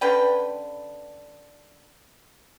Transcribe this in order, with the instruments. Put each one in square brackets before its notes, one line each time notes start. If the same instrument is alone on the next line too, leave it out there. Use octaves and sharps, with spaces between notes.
[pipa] D3 C#4 B4 G5